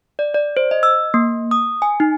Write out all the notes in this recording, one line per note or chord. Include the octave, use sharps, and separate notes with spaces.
D5
D5
C5
D#5
E6
A#3
D#6
G#5
D#4